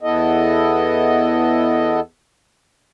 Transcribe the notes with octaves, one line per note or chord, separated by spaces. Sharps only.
E2 B3 E4 A4 D#5